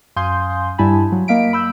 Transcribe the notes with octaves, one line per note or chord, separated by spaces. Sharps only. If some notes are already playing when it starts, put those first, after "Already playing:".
F#2 F5 G#5 C6 D#6 G6
G2 G3 E4 G#5 A5 B5
F#3
A#3 D#5 F5 B6 D7
B5 E6 G6